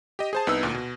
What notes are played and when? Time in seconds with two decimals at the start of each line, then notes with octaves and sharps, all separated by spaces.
0.19 G4 D#5
0.33 G#4 C5 A5
0.47 C2 B3 D#4 B4 E6
0.63 D2 A#2
0.74 B2